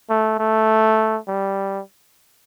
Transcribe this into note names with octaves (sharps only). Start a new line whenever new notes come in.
A3
A3
G3